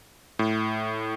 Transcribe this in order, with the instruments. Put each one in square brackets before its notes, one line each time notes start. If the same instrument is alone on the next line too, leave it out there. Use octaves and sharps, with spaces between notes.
[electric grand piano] A2